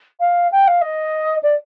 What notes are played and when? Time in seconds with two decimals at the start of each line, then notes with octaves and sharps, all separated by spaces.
0.20 F5
0.52 G5
0.67 F5
0.81 D#5
1.43 D5